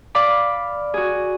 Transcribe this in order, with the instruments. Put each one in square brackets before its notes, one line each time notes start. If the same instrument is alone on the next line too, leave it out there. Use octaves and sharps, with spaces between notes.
[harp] D5 F5 B5 D6
F#4 G#4